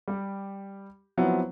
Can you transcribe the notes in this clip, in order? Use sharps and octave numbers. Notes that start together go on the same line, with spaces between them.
G3 G4
F3 F#3 B3 C4 E4